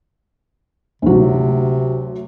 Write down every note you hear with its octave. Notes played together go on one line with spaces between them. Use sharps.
D2 C3 F#3